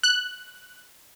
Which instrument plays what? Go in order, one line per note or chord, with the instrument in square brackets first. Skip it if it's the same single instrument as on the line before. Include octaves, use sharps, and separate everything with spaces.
[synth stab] F#6